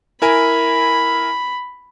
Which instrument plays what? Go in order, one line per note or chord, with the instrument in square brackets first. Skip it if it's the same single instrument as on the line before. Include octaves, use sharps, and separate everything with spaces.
[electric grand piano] E4 A#4 G#5 [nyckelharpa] B5